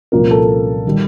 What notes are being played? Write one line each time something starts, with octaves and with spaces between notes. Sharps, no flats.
C2 A#2 F3 A#3 C#4 A#4
A4
D#3 G3